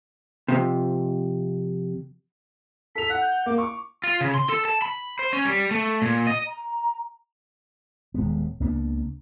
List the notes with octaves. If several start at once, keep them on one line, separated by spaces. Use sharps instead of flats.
F2 G#2 C3
A4 B6 F7
F#5 F#6
G6
A#3 D6
C#6 D6
F4
C#3
C6
A4
A5
B5
C5
C#4
G3
A3
A#2
D#5
A#5
D#1 G#3 B3
C#2 A#3 B3 D4